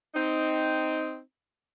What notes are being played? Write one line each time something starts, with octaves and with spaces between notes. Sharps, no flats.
C4 D#4